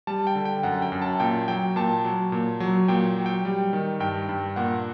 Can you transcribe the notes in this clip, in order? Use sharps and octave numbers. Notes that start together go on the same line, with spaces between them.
G3 A5
G5
D3
G5
F#2 F#5
G5
F#2
A5
A#2 G5
F#3 G5
A#2 A5
F#3
A#2
F#3
A#2 G5
F#3
G5
G3
D#3
G2 G5
G2
A#2 F#5